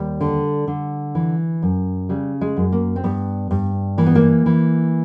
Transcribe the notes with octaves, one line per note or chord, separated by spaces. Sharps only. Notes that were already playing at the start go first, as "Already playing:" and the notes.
Already playing: D#2 G3
D3
D3
E3
F#2
C#3 G3
G#3
F#2
A#3
C4
G2 B3
G2
E3 A#3
B3
A#3
E3